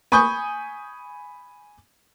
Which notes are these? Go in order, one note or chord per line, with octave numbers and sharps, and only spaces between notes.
G#5 B5 C#6 D#6 G6